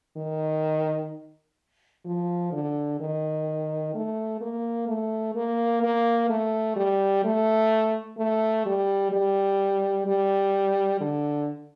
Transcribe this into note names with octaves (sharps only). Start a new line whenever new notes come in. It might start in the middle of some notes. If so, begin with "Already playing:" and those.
D#3
F3
D3
D#3
A3
A#3
A3
A#3
A#3
A3
G3
A3
A3
G3
G3
G3
D3